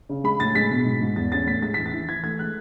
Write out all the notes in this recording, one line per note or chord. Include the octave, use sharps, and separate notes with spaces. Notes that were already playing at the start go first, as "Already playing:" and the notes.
C#3
G#3 B5
A2 A6
G#3 B6
B2
G#2
G#2
E2 A6
C#4 A6
A2 B6
G#3 A6
E3 B6
A6
E3
E3 G#6
A3 G#6
G#3 F#6